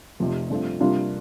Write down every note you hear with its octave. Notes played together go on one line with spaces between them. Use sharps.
F1 F2 C3
G2 F3 A3 C4 F4
C3 G3 A#3 D4 F4